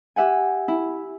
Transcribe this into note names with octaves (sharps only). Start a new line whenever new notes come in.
G4 E5 F#5 G#5
E4